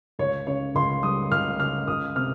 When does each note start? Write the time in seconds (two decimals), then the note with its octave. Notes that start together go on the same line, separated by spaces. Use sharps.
0.19 C#2 C#5
0.47 C#3 C#5
0.75 C#2 C6
1.03 G3 D#6
1.31 C#2 F6
1.59 C#3 F6
1.87 C#2 D#6
2.16 C3 F6